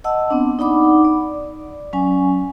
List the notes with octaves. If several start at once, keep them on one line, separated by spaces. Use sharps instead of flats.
D#5 F#5 A5 E6
B3 C4 D4
D#4 D5 F#5 B5 D6
D5
F#3 C#4 G#5